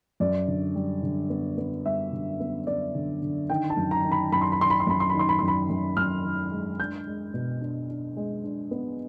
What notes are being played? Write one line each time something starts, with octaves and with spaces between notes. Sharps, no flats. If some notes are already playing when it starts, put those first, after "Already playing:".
F#2 D5
D3
G3
D3
B3
B3
G3 E5
D3
B3
B3 D5
D3
D3
D#3 G5
A5
F#2
A#5
D#3
B5
F#2 B5
C6
B5
D#3 C6
B5
C6
F#2 B5
C6
B5
D#3 C6
B5
F#2 C6
B5
F#2
F#2 F6
D#3
G#3
D4 G6
G#3
B2
D4
D4
G#3
D4
B3